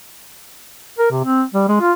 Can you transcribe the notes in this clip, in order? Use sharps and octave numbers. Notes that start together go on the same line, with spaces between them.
A#4
C3
C4
G3
G#3
F4